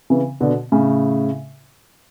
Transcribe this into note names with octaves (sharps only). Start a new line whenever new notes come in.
C#3 E3
B2 D3
A2 C#3